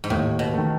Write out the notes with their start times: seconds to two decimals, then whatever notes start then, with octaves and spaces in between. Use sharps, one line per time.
0.04 G#2
0.10 D#2 A2
0.39 B2
0.54 D#3 A3